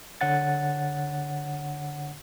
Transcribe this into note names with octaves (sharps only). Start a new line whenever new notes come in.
D3 C#5 F#5 A6